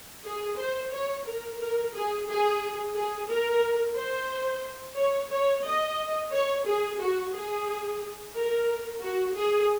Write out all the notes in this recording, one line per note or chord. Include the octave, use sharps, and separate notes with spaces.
G#4
C5
C#5
A#4
A#4
G#4
G#4
G#4
A#4
C5
C#5
C#5
D#5
C#5
G#4
F#4
G#4
A#4
F#4
G#4